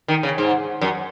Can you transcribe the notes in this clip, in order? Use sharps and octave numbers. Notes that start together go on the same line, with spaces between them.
D#3
C#3
G#2
F#2